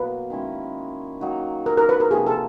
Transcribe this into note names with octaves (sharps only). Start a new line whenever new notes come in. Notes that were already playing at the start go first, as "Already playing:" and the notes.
Already playing: B2 F#3 A#3 B4
D#3 G#3 C#4 E4
D#3 F#3 A#3 D#4
A#4
A#4
B4
A#4
C3 F3 A#3 G#4
A4